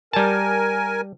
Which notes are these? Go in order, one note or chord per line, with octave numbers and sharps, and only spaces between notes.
G3 A#4 G#5 A5